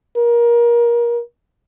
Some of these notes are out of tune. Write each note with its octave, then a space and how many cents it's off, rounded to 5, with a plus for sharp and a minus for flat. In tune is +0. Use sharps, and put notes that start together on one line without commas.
A#4 +25